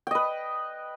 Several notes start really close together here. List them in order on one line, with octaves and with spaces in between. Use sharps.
G5 D#5 B4